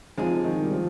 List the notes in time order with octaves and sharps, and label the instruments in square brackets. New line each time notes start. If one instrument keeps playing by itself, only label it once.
[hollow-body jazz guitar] D3 G#3 C4 D#4 G#4 [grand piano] F3
[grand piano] F3
D#3
G3
F3